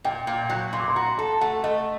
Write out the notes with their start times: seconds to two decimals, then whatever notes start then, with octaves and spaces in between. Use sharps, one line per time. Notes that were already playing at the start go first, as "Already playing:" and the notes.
0.04 A#2 G5
0.27 A#2
0.41 G6
0.50 F#3 F#6
0.73 A#2 C6
0.80 D6
0.88 C6
0.95 F#4 A#5
1.18 A4 A5
1.41 A3 F#5
1.63 A3 D#5